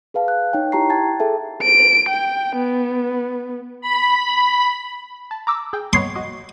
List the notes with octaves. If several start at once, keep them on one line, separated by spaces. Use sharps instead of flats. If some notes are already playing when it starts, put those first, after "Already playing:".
G#4 B4 F5 A5
F#6
D#4 C#5 G5
E4 G4 A5 A#5 C#6 C7
G5 A5 G#6 A6
G#4 A4 E5 A5
D7
G5
B3
B5
A5
A#5 D6 E6
G#4 G5
B3 C#5 D#5 C6
F#4 D#5